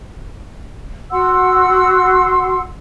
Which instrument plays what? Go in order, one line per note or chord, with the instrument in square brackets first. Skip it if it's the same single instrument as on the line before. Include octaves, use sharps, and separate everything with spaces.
[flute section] F#4 F#5 C6 E6